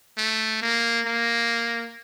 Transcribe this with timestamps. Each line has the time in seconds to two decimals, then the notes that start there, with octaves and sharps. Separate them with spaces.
0.18 A3
0.62 A#3
1.06 A#3